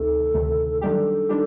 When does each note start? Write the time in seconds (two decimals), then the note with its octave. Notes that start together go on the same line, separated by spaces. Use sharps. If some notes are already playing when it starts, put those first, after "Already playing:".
Already playing: D2 C3 D#3 A3 A4
0.34 D2 C3 D#3 A3
0.81 F#2 D#3 G3 D4 G4 A4
1.29 D#3 G3 D4 G4